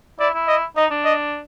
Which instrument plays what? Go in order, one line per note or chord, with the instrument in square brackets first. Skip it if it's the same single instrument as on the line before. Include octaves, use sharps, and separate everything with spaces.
[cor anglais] E4 [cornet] D5
[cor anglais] E4
[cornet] D#5
[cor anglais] D#4 [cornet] D#5
[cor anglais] D4
[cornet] D#5